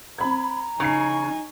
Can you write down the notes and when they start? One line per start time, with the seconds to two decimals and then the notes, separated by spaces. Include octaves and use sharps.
0.19 C4 A#5 B5 G#6
0.80 C#3 D#4 G#5 C#6 C7